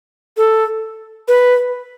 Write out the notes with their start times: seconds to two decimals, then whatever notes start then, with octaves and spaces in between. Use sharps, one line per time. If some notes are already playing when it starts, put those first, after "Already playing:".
0.37 A4
1.28 B4